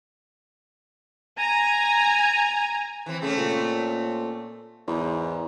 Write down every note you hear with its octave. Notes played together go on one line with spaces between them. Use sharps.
G#5 A#5
E3 C4
C#3 A3 C4 C#4
A#2
E2 G#2